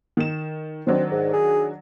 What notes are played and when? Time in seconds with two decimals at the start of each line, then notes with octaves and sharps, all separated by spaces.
0.17 D#3 E7
0.87 D#3 F#3 C4 D4
1.11 G#2
1.33 G#4